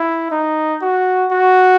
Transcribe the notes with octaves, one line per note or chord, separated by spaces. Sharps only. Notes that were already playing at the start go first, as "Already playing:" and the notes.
Already playing: E4
D#4
F#4
F#4